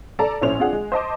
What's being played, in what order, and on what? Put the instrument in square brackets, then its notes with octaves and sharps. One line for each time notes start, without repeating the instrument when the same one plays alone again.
[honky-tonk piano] A4 D5 A5 A#5
A#1 A2 C#4 C5 F7
C4 D4 F4 G#4 F#5
G#3
C5 D#5 A5 D6